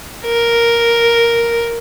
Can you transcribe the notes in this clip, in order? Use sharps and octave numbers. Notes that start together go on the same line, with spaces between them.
A#4